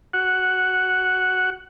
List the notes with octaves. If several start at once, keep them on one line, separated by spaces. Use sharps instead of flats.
F#4 F#5